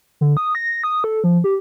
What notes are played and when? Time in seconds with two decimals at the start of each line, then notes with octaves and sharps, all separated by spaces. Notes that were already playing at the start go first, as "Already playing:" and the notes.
0.21 D3
0.37 D#6
0.55 A#6
0.84 D#6
1.04 A4
1.24 F3
1.44 G4